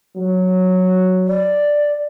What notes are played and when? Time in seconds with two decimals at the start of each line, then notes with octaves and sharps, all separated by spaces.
0.16 F#3
1.27 D5